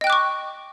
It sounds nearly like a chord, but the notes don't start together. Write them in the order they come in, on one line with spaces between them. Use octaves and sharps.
D#5 G5 F#6 D6 C#6